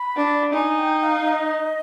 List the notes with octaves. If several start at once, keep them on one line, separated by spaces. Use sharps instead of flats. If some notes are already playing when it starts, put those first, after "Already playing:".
Already playing: B5
D4
D#4 G#5
G5
F5
D#5